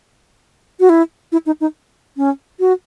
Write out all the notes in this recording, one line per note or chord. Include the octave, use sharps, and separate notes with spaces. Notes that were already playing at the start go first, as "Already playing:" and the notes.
F#4
E4
E4
D#4
D#4
C#4
F#4